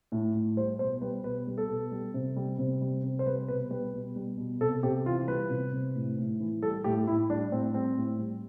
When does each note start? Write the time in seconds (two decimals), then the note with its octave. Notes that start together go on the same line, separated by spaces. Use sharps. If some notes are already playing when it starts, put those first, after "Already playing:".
0.12 A2
0.34 A2
0.57 G3 C5
0.79 B2 C5
1.01 G3 B4
1.24 B2 B4
1.47 G3
1.58 A4
1.69 B2
1.92 G3
2.14 C3
2.36 G3
2.59 C3
2.82 G3
3.04 C3
3.19 C5
3.26 G3 B4
3.48 B2 B4
3.70 G3 B4
3.94 B2
4.16 G3
4.38 B2
4.61 C3 A4
4.83 C3 G4
5.06 E3 F4
5.28 G3 B4
5.50 C3
5.73 C3
5.95 A2
6.18 A2
6.40 E3
6.62 G3 A4
6.84 A2 G4
7.07 A2 E4
7.30 G3 D4
7.52 A2 C4
7.74 G3 C4
7.97 A2
8.19 G3